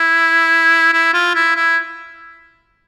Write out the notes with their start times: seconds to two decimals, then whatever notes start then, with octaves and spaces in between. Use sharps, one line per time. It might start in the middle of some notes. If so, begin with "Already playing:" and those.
Already playing: E4
0.93 E4
1.14 F4
1.35 E4
1.55 E4